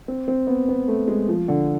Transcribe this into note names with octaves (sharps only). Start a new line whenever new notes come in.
C4
C4
B3
B3
A3
G#3
F3
D3